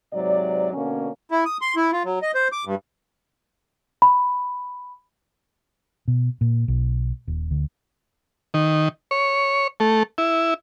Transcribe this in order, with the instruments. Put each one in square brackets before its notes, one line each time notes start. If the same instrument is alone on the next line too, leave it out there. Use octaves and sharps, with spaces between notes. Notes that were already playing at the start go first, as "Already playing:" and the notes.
[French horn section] G#2 C3 F#3 D5
B2 D3 A#3 C#4
[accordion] E4
D#6
C6
E4
F4
F#3
D#5
C5
D6
G2
[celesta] B5
[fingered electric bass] B2
A#2
B1
D#1
D2
[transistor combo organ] D#3
C#5
A3
E4